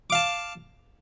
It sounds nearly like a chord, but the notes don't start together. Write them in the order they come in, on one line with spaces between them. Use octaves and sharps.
D6 F5 A5